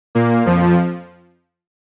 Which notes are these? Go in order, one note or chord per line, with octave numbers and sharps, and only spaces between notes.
A#2 A#3
F2 F3